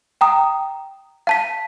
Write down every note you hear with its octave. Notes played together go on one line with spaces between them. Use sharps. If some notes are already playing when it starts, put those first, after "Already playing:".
G5 A#5 D#6
F5 A5 B6